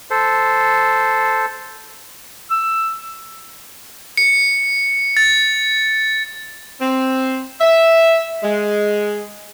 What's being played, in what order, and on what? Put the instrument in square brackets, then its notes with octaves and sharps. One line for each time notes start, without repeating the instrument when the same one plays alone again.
[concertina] A4 C5
[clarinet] E6
[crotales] C#7
A6
[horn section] C4
E5
G#3